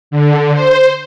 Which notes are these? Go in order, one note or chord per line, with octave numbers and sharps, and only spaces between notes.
D3
C5